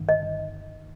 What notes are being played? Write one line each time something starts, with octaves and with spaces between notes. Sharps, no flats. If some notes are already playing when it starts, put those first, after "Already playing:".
Already playing: G1 D#3
D#5
G1